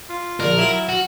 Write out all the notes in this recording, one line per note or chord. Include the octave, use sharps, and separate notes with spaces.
F4
A#1 A#2 D3 A#4
F#3 E4 F4
F#4